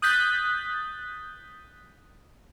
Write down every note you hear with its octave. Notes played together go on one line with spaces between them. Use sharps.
D#6 F#6 G6 A6 B6